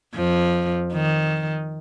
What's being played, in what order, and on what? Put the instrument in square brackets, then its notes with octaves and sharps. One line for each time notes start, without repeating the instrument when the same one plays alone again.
[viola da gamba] F2 F3
D#3